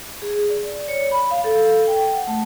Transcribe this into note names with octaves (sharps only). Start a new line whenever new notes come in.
G#4
D5
C#5
B5
F5
A4
G5
F#5
A3